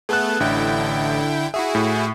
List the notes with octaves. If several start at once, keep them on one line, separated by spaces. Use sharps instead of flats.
A3 B3 G#4 A4 F#6
A1 D3 E4 G5
E4 F#4 G#4 E5
A2